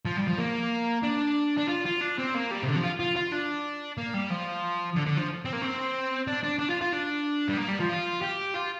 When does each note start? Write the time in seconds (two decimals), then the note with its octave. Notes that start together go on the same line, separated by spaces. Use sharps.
0.05 F3
0.17 G3
0.28 F3
0.38 A#3
1.03 D4
1.58 D4
1.69 F4
1.86 F4
2.01 D4
2.19 C4
2.35 A#3
2.51 G3
2.63 C3
2.67 D3
2.76 F3
2.84 F4
3.00 F4
3.16 F4
3.32 D4
3.97 A#3
4.14 G3
4.30 F3
4.96 D3
5.07 D3
5.17 F3
5.45 C4
5.53 A#3
5.62 C4
6.27 D4
6.43 D4
6.59 D4
6.70 F4
6.81 F4
6.93 D4
7.49 G3
7.57 A#3
7.68 G3
7.80 F3
7.90 F4
8.23 G4
8.55 F4